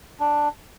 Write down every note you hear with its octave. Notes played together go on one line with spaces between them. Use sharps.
D4